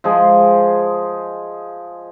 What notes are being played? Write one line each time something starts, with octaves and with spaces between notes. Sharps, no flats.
F3 G#3 G#4